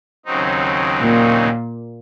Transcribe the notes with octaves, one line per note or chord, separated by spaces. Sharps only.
D#2 C#3 F#3 C4 D#4
A#2